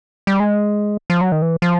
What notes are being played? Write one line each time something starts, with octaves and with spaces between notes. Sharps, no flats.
G3
G#3
F3
F#3
D#3
E3
F3